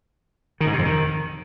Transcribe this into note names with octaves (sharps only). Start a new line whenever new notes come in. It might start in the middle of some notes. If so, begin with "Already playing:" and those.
D#3
G#2
C3
F2
D#3